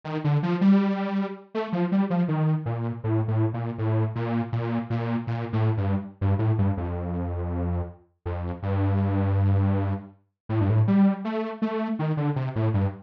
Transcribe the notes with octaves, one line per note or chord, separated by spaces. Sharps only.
D#3
D3
F3
G3
A3
F3
G3
F3
D#3
A#2
A2
A2
A#2
A2
A#2
A#2
A#2
A#2
A2
G2
G2
A2
G2
F2
F2
G2
A2
G2
A2
G3
A3
A3
D#3
D3
C3
A2
G2